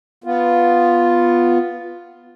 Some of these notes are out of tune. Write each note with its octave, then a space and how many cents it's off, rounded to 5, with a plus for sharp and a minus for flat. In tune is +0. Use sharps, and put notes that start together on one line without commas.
B3 +0 F4 +0